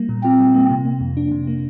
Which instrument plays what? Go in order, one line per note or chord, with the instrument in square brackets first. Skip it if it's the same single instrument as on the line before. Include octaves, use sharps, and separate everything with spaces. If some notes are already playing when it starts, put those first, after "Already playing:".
Already playing: [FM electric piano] G3 A#3
A#2
[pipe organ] C4 [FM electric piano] F4
[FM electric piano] G3
A#3
C3
A#3
F2
D4
C3
A#3